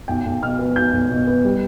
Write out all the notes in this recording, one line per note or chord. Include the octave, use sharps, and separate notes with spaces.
B1 G5
B1
B2 F6
B3
B1 G6
B1
B2
B3
G3